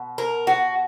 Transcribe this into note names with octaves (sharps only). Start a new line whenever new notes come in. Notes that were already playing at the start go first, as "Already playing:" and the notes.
Already playing: B2
A#4
F#4